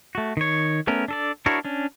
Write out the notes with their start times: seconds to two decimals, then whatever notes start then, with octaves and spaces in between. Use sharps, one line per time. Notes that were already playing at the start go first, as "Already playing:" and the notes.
0.15 A3 F#4
0.37 D#3 C#5
0.87 A3 B3 C#4 A#4
1.08 D4 A4 D5
1.46 D4 E4 F#4 A#4 C#5
1.65 C#4 D4